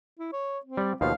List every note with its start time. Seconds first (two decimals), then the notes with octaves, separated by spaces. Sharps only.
0.19 E4
0.33 C#5
0.65 C4
0.77 G3 D5
1.01 D#2 B2 F3 F5